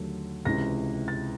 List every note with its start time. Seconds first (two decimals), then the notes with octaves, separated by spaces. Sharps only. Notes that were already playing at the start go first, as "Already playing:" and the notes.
Already playing: D#2 D3 F#3 A3
0.45 C#2 C3 E3 A#6
1.08 A6